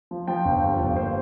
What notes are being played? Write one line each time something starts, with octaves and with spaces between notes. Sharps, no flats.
F3
F3 G5
G1
G2
G1
A#3 C5